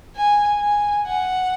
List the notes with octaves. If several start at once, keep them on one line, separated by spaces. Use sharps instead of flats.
G#5
G#5
F#5